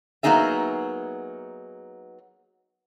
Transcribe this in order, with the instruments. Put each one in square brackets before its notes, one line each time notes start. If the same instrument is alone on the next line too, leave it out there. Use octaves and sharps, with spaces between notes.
[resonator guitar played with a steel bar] F#3 A#3 B3 D#4 G#4 E5